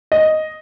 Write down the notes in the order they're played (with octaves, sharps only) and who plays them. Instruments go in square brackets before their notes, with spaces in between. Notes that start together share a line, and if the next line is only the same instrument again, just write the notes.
[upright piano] D#5